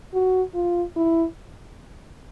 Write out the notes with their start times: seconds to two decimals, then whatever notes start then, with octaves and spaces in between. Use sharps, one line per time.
0.14 F#4
0.54 F4
0.96 E4